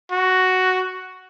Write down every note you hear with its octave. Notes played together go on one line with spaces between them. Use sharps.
F#4